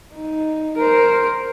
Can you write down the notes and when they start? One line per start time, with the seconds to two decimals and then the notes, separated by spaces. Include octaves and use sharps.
0.14 D#4
0.77 A#4 C5